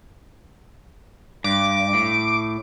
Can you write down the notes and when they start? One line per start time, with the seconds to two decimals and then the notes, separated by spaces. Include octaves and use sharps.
1.44 G2 D6
1.93 A2